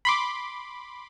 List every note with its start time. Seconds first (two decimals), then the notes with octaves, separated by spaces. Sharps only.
0.05 B5 C6 D6